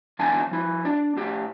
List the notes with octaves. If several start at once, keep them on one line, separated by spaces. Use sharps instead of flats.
E2 G#2 D3 E4 G#5 A5
F3 E4
D4
A2 G4